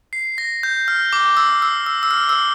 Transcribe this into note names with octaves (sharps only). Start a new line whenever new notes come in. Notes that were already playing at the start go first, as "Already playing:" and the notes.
C7
A#6
G6
F6
D6
E6
E6
E6
E6
F6
E6